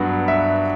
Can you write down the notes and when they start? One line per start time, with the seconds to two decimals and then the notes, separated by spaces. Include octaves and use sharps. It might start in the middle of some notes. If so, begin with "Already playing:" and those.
Already playing: G2 F#3 B3 F#5
0.28 E5